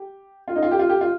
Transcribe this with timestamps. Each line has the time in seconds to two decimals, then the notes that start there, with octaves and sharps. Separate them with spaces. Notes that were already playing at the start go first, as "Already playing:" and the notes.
Already playing: G4
0.48 F4
0.56 D#4
0.62 F4
0.71 G4
0.79 F4
0.89 G4
1.01 F4